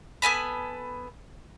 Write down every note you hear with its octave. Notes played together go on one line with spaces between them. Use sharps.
B3 A4 G#5 B5